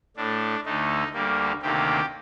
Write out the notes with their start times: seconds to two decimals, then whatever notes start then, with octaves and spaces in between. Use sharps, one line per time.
0.16 A2 A3 D4
0.65 D2 D3 A3 D#4
1.13 D2 D3 G3 A#3
1.62 D2 C3 D#3 A#3 G4